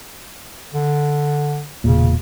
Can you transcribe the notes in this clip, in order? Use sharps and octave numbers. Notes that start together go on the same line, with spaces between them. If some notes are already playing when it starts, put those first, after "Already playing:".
D3
E1 A#2 C#3